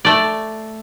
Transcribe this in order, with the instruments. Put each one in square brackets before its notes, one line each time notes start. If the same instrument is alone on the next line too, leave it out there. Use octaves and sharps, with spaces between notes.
[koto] A3 D5